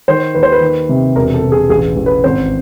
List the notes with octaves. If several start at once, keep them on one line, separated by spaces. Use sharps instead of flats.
D#3 C5
D#2 B4
C5
B4
D#3
C3
E1 A#4
A4
E1
G#4
A1 G#4
A1
B4
G#1 C5